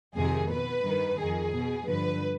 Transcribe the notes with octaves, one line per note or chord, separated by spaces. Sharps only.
F2 C3 D#3 G#4
B2 B4
G2 D#3
F2 D#3 G#4
B2
G2 D3 F3 B4